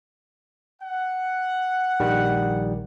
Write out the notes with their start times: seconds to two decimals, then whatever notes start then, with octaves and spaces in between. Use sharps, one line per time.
0.82 F#5
2.00 A#1 D#3 G3